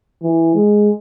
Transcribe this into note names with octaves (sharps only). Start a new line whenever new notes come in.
E3
G#3